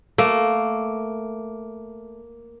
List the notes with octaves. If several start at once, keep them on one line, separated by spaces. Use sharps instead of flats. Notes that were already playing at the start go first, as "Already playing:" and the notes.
A3 A#3